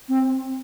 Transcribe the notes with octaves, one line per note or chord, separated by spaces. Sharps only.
C4